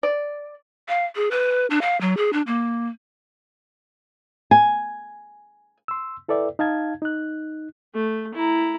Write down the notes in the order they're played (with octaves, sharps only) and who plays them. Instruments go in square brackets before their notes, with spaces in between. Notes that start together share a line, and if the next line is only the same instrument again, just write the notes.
[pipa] D5
[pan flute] F5
G#4
B4
D4
F5
F#3
G#4
D4
A#3
[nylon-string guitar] G#5
[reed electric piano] C6 E6
E4 A4 B4 D5 E5 G5
D#4 F5 A5 G#6
D#4 F#6
[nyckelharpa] A3
E4 A#5